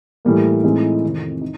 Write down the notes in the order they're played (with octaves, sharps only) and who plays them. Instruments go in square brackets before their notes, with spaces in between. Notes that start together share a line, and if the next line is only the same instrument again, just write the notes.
[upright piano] A2 E3 G3 A#3
A2 E3 G#3 C4 D#4
F2 C3 D#3
D#4